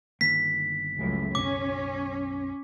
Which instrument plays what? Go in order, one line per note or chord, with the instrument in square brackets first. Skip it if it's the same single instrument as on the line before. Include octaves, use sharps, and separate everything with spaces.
[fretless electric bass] G1 D#3 A#3 [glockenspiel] B6
[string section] C#2 F#2 A2 [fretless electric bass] F3 G#3
[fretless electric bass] B1 F#2 [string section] C#4 [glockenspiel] D6